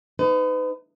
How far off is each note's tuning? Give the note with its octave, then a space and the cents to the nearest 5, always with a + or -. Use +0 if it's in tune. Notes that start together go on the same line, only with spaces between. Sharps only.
D#4 +0 B4 +40